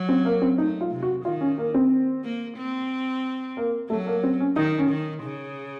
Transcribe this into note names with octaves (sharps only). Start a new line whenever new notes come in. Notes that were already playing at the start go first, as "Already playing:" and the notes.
Already playing: F#3
C4
A#3
C4
A3 D#4
F4
C3
F#4
D#3 F4
C#4
A#3
C4
A#3
C4
A#3
F#3 A3
A#3
C4
C#4
D#3 D#4
C#4
D#3
C#3